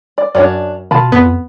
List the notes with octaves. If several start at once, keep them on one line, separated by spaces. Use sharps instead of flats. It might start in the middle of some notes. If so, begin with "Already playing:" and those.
D5
F#2 D4 C#5 D5
B2 F4 A5 B5
F2 B3